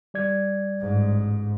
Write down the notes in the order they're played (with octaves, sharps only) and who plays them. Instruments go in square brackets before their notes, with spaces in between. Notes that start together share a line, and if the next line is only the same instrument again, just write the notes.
[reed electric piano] G3 D5 G#6
[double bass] A1 G#2